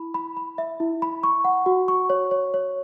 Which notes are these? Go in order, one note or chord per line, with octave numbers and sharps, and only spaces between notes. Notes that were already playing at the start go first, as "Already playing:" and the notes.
Already playing: E4 B5
B5
B5
E5
E4
B5
C#6
F#5
F#4
C#6
C#5
C#5
C#5